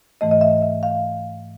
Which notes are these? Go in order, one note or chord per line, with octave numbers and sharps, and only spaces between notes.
G#2 E3 A3 D#5
D#5
E5
E5
F5